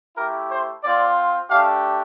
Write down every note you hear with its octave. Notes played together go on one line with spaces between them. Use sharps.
A3 E4 G4 A#4
C5
C4 F4 D5
A3 D4 G4 F5